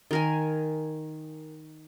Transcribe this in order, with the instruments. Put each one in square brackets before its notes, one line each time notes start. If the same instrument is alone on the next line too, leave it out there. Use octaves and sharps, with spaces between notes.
[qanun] D#3 A#4 G#5